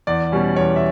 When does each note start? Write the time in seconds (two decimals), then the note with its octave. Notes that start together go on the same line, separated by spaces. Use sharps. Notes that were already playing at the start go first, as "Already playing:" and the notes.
0.07 E2 D5
0.32 B2 G3 C#4
0.56 E2 C#5
0.76 E5